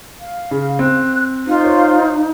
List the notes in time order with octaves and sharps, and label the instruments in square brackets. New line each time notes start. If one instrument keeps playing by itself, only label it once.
[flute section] F5
[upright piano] C#3
[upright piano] C4 [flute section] F#6
[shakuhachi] D#4 [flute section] F4 C5
[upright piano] C#5